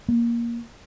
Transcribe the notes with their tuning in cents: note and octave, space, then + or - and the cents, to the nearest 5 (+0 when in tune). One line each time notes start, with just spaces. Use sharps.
A#3 +10